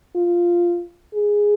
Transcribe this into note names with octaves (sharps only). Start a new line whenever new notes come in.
F4
G#4